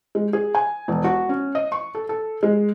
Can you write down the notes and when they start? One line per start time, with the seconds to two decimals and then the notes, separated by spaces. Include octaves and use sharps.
0.15 G#3
0.33 G#4
0.55 G#5
0.88 E1
1.04 F#4
1.29 C#4
1.55 D#5
1.72 C#6
1.95 A4
2.09 A4
2.43 G#3